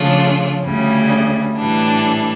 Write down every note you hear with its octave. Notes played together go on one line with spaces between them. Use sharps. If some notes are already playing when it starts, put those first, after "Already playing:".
Already playing: C#3 F3 A3 D4 F4
D2 C#3 G3
A2 E3 G3 D4